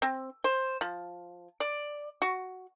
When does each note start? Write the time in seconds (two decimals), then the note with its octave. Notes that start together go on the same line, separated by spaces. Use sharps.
0.02 C4
0.44 C5
0.81 F3
1.60 D5
2.22 F#4